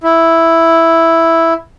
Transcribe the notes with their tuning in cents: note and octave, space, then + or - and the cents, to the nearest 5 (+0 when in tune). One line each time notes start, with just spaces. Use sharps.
E4 +0